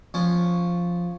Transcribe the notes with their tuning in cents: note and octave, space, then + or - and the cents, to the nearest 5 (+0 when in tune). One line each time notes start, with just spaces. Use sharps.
F3 +0 C#4 +0